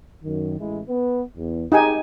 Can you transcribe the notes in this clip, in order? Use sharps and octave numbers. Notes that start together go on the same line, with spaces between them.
F#2 D#3
A1 G#3 E4
B3 B4
E2
D#4 G4 G#4 G#5